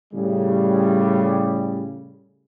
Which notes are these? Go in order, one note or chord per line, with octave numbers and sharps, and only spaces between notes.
A2 C#3 G3